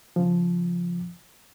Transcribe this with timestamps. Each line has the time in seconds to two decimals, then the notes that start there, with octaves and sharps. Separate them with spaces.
0.16 C#3 F3